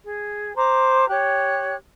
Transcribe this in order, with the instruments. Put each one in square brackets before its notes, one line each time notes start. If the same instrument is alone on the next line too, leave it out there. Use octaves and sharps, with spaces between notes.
[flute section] G#4
C5 A#5 D6
G4 C#5 F#6